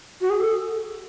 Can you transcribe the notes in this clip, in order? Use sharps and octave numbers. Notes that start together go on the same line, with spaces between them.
F#4
G#4
A4